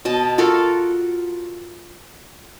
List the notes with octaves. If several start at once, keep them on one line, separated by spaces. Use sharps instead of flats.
B2 D#5 A5
F4 F#4 A4 A#4